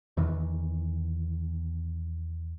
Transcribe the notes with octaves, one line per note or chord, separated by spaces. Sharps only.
E2 D#3 E3